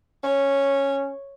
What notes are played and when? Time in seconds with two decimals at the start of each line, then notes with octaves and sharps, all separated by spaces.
0.24 C#4 C#5